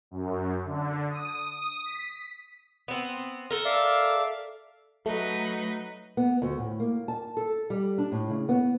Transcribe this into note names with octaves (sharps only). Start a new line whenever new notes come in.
F#2
D3
D#6
D#6
B6
B3 C4
A4 A#4
D5 E5 F5
F#3 A3 D#4 B4
B3
D2
A2
A#3
A5
A4
G3
D4
A2
C#3
B3